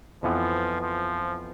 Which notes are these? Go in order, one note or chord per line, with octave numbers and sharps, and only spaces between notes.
F2 E3 F3 B3
F3